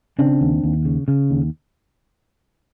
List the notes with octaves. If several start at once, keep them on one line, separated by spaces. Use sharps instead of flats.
C#3 C4 D4
D#2
D#2
C#3
C#3
D#2